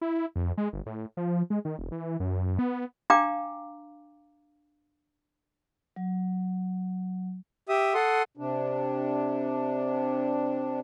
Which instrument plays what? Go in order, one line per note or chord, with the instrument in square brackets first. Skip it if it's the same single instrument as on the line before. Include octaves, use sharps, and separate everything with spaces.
[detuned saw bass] E4
F2
G#3
G1
A2
F3
G#3
D#3
E1
E3
F#2
B3
[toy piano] D4 F5 G5 A#5 D6
[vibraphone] F#3
[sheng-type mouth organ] G4 E5 D#6
A4 F#5 C6 D#6
[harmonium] C3 D4